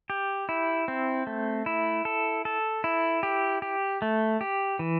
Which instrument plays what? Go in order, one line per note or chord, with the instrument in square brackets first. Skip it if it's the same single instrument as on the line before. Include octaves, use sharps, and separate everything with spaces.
[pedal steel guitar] G4
E4
C4
A3
E4
A4
A4
E4
G4
G4
A3
G4
E3